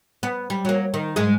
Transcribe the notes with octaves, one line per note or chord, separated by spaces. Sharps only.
B3
G3
F#3 A#3
D#3
G#2 G#3 G#4